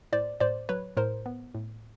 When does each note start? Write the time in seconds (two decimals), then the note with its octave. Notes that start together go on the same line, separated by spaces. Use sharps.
0.13 A2 C5 D5
0.40 A2 C5 D5
0.69 F#3 B4 C#5
0.97 A2 A#4 C5
1.26 B3
1.55 A2